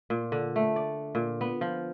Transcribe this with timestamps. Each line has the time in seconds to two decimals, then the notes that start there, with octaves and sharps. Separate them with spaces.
0.10 A#2
0.32 D3
0.56 A3
0.76 D5
1.15 A#2
1.41 B3
1.61 F3